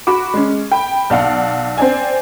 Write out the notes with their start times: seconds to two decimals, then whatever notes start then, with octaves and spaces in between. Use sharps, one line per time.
0.07 F#4 B5 D6
0.34 G#3 C#4
0.72 G5 B5
1.10 B1 D5 F5 F#5
1.77 C4 D5 G#5